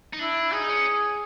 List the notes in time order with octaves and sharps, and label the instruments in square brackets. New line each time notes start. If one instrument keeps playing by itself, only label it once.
[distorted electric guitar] D#4
[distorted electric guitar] D4 [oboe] E4
[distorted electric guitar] D#4 [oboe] G#4
[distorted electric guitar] C#4